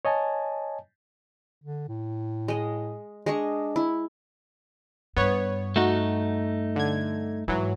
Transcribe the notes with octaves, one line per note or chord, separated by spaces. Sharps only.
C#5 D#5 G#5 A5
D3
A2
G#3 D#5
G#3 D4 D#5 C#6
E4
G2 B3 C#5
A3 D#4 F#4
D3 G#6
G#2 E3 F#3